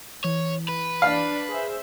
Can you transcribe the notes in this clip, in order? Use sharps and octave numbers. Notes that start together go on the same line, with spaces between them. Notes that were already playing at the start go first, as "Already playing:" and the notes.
E3 C#5
B4
D4 F5 B5
G#4 C5 E5